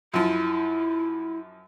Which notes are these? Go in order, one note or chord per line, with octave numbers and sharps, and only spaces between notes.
F#2 F3 E4